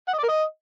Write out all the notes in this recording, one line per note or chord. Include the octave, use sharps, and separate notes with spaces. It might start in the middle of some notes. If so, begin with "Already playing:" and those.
F#5
D#5
D5
A#4
D#5